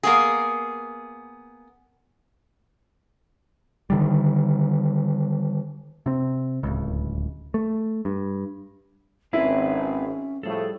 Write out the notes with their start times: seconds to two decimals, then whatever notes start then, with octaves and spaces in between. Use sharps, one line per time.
0.03 A#3 B3 G#4
3.90 D3 D#3 G3
6.06 C3 C4
6.63 D1 C#2
7.54 A3
8.05 G2
9.33 G#1 C4 C#4 E4 G#4 B4
10.43 A2 F3 G3 A3 G#4 A4